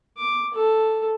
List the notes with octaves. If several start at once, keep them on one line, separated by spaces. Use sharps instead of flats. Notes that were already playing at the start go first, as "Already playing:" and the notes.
D6
A4